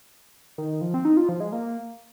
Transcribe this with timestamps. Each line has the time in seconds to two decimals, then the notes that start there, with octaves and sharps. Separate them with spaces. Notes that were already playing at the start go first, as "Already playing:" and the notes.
0.58 D#3
0.81 F3
0.94 C4
1.05 D#4
1.17 F4
1.29 F3
1.40 G#3
1.52 A#3